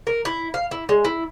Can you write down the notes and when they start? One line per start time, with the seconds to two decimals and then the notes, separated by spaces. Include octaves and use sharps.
0.07 A#4
0.25 E4
0.54 F5
0.71 E4
0.89 G#3
1.05 E4